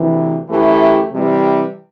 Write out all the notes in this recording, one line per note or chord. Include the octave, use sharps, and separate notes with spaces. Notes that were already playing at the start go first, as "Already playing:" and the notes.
Already playing: D2 C3 E3
F#2 E3 A3 E4 G4
C3 E3 G3